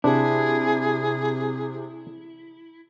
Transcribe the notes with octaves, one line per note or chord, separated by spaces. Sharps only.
C3 D4 E4 G#4